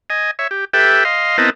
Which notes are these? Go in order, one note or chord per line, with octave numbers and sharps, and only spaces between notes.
D#5 G#5
C#5 E5
G4
G4 A4 B4 E5 G5
D#5 F5 C6
B3 C4 E4 A#4 D#5 A5